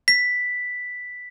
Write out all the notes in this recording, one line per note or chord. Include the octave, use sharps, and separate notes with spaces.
B6